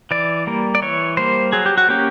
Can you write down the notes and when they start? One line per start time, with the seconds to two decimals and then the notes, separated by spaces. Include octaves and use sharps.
0.11 E3 D5
0.47 G3 A#3
0.75 D5
0.82 E3 C#5
1.17 G3 A#3 C5
1.52 F#3 G#4
1.66 G4
1.78 F#4
1.89 A#3 C#4 G4